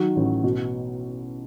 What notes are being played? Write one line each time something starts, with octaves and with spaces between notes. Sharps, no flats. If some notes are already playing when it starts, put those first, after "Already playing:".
Already playing: D#3 F#3
A1
B2